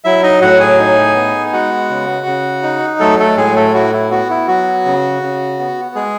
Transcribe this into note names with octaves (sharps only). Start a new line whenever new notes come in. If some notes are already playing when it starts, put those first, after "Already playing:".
F#3 E4 E5
D#4 D#5
A2 F#4 F#5
G#4 G#5
D#4
B3
G#5
G#3 F#4 F#5
C#3
C#3
D#4
F#3 A3 A4
A3 A4
A2 G#3 G#4
A3 A4
E4 F#4
E4
B3 F#4
E4
F#3 F#4
C#3
C#3
B3
G#3 G#4